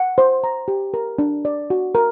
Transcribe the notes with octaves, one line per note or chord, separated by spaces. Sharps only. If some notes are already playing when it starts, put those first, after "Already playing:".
Already playing: F#5
C5
A#5
G4
A#4
D4
D5
F#4
A#4